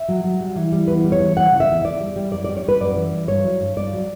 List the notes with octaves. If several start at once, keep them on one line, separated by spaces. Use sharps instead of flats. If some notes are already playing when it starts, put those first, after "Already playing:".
Already playing: E5
F#3
F#3
G3
E3
G3
E2 B4
G3
C#5
E3
G3 F#5
C#3
E5
E2
E2 D5
G3
G3
F#2 D5
G3 D5
C#5
G3 B4
F#2 D5
E3
G3
G2 C#5
F#3
G2
G2 D5
F#3